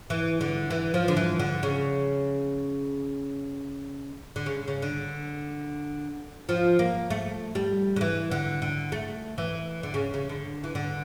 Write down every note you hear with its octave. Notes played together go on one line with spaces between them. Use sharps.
E3
D3
E3
F3
D3
E3
D3
C#3
D3
C#3
C#3
D3
F3
A#3
A3
G3
D3
E3
D3
D3
A3
E3
D3
C#3
C#3
D3
E3
D3